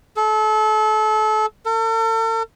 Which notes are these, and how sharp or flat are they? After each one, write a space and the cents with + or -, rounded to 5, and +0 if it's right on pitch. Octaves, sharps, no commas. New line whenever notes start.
A4 -30
A4 +45